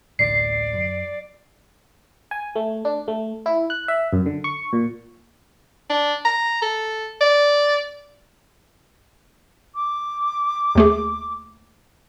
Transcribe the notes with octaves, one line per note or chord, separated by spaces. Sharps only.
A1 D2 D3 D5 C7
F#2
G#5
A3
D4
A3
E4
F#6
E5
F#2
D3
C#6
A#2
D4
A#5
A4
D5
D6
D#2 A3 G#4